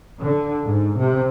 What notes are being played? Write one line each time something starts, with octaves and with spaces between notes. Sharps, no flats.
D3
G#2
C3